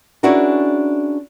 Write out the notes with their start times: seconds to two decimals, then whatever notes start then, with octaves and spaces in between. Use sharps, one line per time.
0.23 C#4 D4 E4 F#4 G#4 A#4